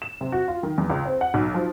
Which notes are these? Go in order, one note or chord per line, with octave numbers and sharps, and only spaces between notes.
E7
C3
F#4
F4
D#3
E2
C#2
C4
F#5
B1
F3